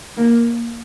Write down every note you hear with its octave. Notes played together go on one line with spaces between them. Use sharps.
A#3